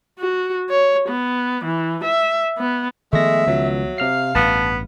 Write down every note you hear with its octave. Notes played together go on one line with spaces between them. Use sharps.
F#4
C#5
B3
E3
E5
B3
D#3 F3 G#3 A3 B3 E5 A#6
C#2 F#3
C3 F5 F6 C7
A1 G2 B3 A5